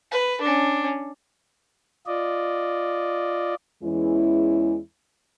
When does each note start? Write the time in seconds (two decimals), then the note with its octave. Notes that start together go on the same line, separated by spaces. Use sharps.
0.12 B4
0.41 C#4 D4
2.07 F4 D5 D#5
3.83 E2 E3 G#3 C#4 E4